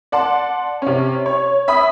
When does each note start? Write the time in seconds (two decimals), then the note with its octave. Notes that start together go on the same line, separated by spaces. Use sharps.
0.12 D5 F#5 A5 C6
0.82 C3 C#4
1.26 C#5
1.68 E5 B5 D#6